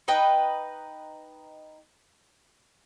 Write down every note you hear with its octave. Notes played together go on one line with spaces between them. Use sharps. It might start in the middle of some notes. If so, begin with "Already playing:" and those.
D#4 B4 G5